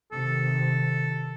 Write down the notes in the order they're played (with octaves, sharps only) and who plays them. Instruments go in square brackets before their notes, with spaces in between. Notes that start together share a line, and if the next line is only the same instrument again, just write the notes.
[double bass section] C3 D#3 [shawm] A4